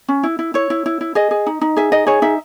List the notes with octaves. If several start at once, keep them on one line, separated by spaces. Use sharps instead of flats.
C#4
E4
E4
E4 C#5
E4
E4
E4
G#4 D#5
G#4
D#4
D#4
G#4 E5
D#4 D#5
G#4 C#5
D#4 E5